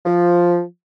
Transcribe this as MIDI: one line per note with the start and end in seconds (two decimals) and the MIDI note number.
0.06 0.61 53